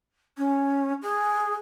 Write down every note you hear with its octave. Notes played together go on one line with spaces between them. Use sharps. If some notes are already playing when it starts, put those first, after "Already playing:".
C#4
G#4